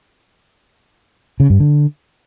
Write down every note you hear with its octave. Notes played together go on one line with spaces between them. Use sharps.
C#3
G2
D3